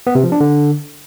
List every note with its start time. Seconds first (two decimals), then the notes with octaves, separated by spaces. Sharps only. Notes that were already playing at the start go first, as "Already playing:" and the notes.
0.07 B3
0.15 C3
0.24 F3
0.32 D4
0.40 D3